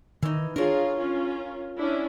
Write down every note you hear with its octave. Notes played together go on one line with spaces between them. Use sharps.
D#3 E3 D#4
D4 F4 G#4 A#4 C#5
C#4 F4
C#4 D4 E4